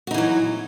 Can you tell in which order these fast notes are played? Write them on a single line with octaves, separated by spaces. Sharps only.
F#4 D#4 E3 F#3